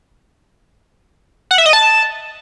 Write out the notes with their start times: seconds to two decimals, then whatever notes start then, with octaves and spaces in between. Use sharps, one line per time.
1.51 F#5
1.58 E5
1.66 D#5
1.73 A5